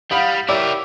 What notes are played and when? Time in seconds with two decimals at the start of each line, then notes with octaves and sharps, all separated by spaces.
0.11 G3 F5 F#5 B5 D#6
0.49 E4 G4 A#4 C#5 D5 E5 D6 E6